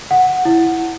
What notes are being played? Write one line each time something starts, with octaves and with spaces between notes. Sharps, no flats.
F#5
E4